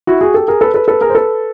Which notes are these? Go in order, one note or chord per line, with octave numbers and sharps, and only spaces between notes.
E4 F#4
F#4 G#4
G4 A4
G#4 A#4
A4 B4
A4 B4
A4 B4
G#4 A#4
C5
A4 B4